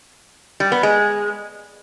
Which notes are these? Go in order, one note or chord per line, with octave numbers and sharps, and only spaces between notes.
G3
B3
G#3